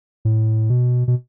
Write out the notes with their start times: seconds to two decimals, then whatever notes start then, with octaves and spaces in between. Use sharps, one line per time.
0.25 A2
0.70 B2
1.08 B2